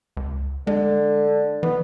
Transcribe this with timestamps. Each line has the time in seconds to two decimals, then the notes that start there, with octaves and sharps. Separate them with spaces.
0.17 C#2
0.67 D3 G#3
1.63 E3 B3